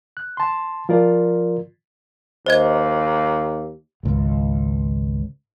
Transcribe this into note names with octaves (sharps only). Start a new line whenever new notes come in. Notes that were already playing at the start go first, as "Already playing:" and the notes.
F#6
A5 C6
F3 F4 A#4 D5
D#2 C5 D#5 G#6
G#1 C#2